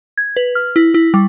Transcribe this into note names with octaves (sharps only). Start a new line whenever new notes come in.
G#6
B4
F6
E4
E4
G3